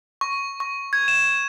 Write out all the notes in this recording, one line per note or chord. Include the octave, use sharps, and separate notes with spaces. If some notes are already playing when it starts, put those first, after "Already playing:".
C#6
C#6
G#6
E7